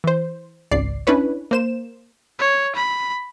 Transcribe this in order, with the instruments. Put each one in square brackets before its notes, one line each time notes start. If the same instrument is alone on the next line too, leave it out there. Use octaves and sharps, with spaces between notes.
[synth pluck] E3 C5
G#1 C#2 D5 C7
C#4 D4 E4 B4 C#5
A#3 C5 E7
[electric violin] C#5
B5